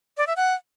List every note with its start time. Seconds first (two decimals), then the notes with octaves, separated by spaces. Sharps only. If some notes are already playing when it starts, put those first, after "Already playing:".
0.17 D5
0.27 E5
0.37 F#5